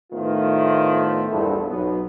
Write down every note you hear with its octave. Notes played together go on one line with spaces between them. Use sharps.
A2 D#3 A3 B3 F4 C5
A#1 E2 G2 B3 E4 A4
B1 B3